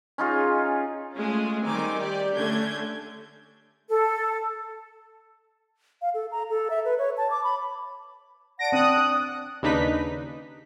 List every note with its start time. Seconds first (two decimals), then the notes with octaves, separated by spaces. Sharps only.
0.18 C#4 D#4 F4 G#4
1.15 G#3 A3 C#4 F4 G#4
1.65 D#3 G3 C4 D#4 G#5 D6
1.98 G4 D5
2.35 D3 A3 C#4 D4 G6 G#6
3.90 A4
6.02 F5
6.14 A4
6.32 A#5
6.50 A4
6.70 E5
6.85 B4
6.98 C#5
7.17 A5
7.31 D6
7.44 B5
8.59 D5 F#5 A5 A#6 D7
8.72 C4 D#6 F#6
9.00 D4
9.62 D#2 C#3 D4 D#4 B4 B6